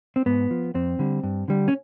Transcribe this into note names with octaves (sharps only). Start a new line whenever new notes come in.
C4
G#2 B3
F3
F2 C4
D3 G3
G2
D3 G3
C#4